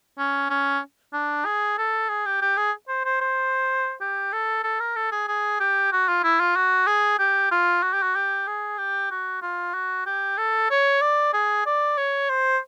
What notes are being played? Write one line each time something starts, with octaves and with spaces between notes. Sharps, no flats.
C#4
C#4
D4
G#4
A4
G#4
G4
G4
G#4
C5
C5
C5
G4
A4
A4
A#4
A4
G#4
G#4
G4
F#4
F4
E4
F4
F#4
G#4
G4
F4
F#4
G4
F#4
G4
G#4
G4
F#4
F4
F#4
G4
A4
C#5
D5
G#4
D5
C#5
C5